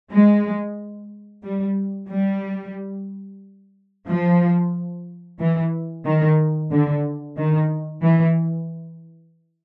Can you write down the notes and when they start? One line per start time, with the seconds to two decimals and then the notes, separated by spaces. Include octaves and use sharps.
0.11 G#3
1.43 G3
2.09 G3
4.08 F3
5.39 E3
6.05 D#3
6.71 D3
7.37 D#3
8.03 E3